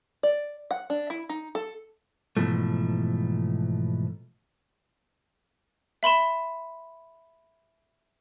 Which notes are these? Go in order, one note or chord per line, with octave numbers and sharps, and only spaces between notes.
D5
F#5
D4
E4
D#4
A4
G#2 B2 E3 F3 A3
E5 B5 C6 E7